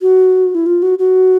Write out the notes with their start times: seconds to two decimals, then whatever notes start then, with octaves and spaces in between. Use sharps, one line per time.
0.02 F#4
0.55 E4
0.66 F4
0.82 F#4
0.99 F#4